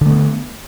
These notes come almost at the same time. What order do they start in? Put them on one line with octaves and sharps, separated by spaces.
D3 A3 B3